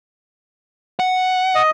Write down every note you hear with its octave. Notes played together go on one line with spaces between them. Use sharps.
F#5
D#5